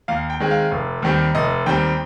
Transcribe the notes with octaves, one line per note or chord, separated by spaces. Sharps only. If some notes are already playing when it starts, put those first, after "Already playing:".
D#2 F5
G5
D#3 G#3 C4
F5
F1
D#2 D#3 G3 C4
F1 D#5
D#2 D#3 G3 C4 G5